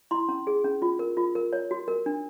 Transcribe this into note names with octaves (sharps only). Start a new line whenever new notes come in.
E4 C6
C#4
G#4
C#4
F4
A#4
F4
A#4
C#5
F#4
A#4
D4